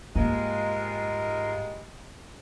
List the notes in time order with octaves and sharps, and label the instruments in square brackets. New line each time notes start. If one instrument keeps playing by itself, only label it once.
[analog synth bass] G#2 [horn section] G3 G#3 [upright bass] A#3 [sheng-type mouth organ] F4 A#4